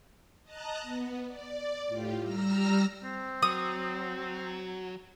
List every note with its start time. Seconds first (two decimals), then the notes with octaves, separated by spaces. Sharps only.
0.43 D#5 A5 A#5 F#6
0.82 B3
1.27 D5
1.87 A2 F4 G4
2.20 G3 A#5 E6 F6 A#6
3.04 C4
3.42 F#3 D#6